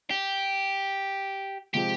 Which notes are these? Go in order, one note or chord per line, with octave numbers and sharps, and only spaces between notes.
G4
C3 F3 G#3 C4 G4